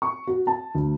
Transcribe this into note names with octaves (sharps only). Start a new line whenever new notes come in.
C#6
F#4
A5
D2